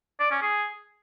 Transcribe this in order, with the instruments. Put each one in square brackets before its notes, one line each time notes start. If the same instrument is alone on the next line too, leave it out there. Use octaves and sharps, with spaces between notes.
[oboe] D5
C#4
G#4